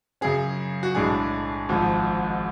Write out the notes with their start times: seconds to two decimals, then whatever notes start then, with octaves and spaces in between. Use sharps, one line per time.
0.21 F#2 C#3 F#3 C#4 G#4
0.83 F#4
0.95 B1 A2 G#3 D4 G#4
1.69 G#1 G#2 F3